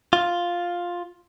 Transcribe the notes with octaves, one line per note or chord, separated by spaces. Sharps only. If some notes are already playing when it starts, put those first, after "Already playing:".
F4